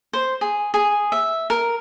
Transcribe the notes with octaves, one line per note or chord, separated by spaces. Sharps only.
C5
G#4
G#4
E5
A#4